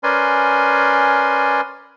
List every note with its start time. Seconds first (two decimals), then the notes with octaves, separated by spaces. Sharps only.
0.03 C#4 A#4 B4 D5 G#5 C6